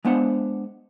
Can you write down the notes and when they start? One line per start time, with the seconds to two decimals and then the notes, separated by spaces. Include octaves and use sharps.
0.04 G#3 B3 D4 C5 F#5